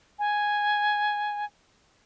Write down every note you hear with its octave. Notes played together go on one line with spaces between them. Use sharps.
G#5